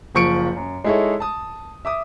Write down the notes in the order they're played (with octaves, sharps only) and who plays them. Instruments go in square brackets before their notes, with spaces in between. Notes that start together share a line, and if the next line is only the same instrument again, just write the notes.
[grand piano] F#1 F3 C#6 C#7 D7
F#2
G#3 D#4 E4 G#4 A4 C#5
A5 D#6
E5 D6 D#6